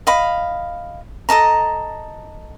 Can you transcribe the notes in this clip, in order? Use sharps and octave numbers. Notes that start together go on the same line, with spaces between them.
D#5 F5 B5
A4 D#5 A5 A#5